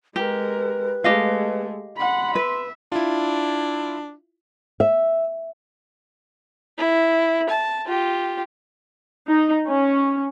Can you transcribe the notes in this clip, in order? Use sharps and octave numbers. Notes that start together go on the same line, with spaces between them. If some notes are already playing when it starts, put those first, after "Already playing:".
G#3 G4 A#4 B4
G#3 A3 G4 D#5 F5
F#5 B5 C6
B4 E5
D4 E4 F4
E5
E4
A5
F4 G4
D#4
C#4